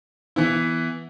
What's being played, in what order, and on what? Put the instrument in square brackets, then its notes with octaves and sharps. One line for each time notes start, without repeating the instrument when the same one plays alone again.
[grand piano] E3 B3 E4